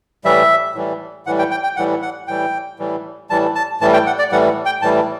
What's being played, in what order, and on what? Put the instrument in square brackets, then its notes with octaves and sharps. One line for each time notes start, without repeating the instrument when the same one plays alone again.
[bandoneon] A2 E3 G3 E5
A2 E3 G3
A2 E3 G3 F#5
G5
G5
G5
A2 E3 G3 F#5
F#5
A2 E3 G3 G5
A2 E3 G3
A2 E3 G3 A5
A5
A2 E3 G3 A5
G5
F#5
D5
A2 E3 G3 F#5
G5
A2 E3 G3 A5